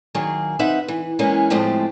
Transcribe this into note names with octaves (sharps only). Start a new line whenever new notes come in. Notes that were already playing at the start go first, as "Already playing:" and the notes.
D#3 F#3 A#3 G#4
C4 D#4 B4 E5 F#5
E3
E3 G#3 A#3 B3 C#4 G#4
A2 F3 G#3 A3 C4 G4